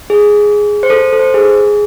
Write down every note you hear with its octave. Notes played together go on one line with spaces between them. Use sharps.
G#4
C5
A4
A4
C5
G#4